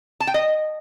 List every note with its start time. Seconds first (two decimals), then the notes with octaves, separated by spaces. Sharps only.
0.20 A5
0.27 G5
0.34 D#5